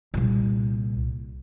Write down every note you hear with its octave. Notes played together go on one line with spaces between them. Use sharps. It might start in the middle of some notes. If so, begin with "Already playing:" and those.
C2 A#2